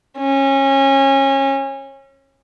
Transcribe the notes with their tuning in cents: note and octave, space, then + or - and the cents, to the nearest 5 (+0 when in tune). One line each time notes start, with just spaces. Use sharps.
C#4 -25